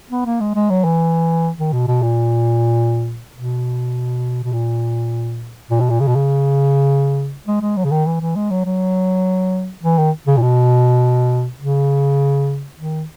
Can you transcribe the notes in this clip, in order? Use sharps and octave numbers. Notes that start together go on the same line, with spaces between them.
B3
A#3
G#3
G#3
F#3
E3
D#3
B2
B2
A#2
B2
B2
A#2
A#2
B2
A#2
C#3
B2
C#3
G#3
G#3
F#3
C#3
D#3
E3
E3
G#3
F#3
F#3
E3
D#3
C#3
A#2
B2
C#3
D#3